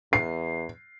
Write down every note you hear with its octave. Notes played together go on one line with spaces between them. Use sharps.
E2 C7